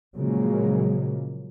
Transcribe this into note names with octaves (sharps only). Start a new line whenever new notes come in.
A#2 C#3 F3 F#3 G#3 A#3